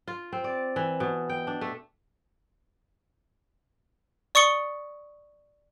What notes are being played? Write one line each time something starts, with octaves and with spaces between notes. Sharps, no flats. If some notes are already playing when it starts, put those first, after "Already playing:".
F4
C4
D5
E3
B2
G5
D4
A3
D5 C#6 D#6 C#7 G7